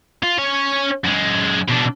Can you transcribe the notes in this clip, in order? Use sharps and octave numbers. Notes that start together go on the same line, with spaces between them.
F4
C#4 C#5
F#2 G#3
B2 D4